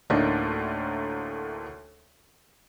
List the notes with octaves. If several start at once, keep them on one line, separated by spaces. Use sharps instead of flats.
D2 A2 A#3 D4 D#4